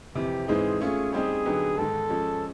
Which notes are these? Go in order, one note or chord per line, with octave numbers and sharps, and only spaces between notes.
F2 C3 E3 G4
G#2 E3 G#3 C4 D#4 G#4
A3 C#4 F4 G#4
G3 C4 D#4 G4 G#4
D3 F#3 B3 D#4 G4
G#2 D#3 G#3 A4
F3 G#3 C#4